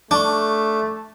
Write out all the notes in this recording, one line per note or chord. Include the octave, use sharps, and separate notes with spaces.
A3 D4 A5 C#6